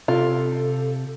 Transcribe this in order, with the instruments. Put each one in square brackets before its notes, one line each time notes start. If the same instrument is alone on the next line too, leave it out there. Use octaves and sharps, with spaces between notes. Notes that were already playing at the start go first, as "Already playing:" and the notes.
[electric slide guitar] C3 C4 G4 [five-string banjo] F4 [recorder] A4